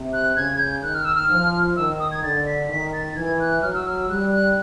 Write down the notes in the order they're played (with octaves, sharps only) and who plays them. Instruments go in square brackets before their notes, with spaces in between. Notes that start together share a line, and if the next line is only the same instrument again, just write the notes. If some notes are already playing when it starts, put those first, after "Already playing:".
Already playing: [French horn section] C3
[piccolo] F#6
[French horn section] C#3 [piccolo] G#6
[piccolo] G#6
G6
[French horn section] D#3 [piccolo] F#6
[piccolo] F6
E6
F6
[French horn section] F3
[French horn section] D#3 [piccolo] E6
[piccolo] D#6
G#6
[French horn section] D3 [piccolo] A6
[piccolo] B6
[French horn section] D#3 [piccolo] B6
[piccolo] A6
[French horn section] E3 [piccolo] G#6
[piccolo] F#6
[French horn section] F#3 [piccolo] F6
[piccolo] E6
F6
E6
[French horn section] G3 [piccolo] F#6
[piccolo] F#6